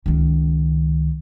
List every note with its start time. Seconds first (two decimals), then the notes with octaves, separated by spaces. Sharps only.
0.06 C#2 D#3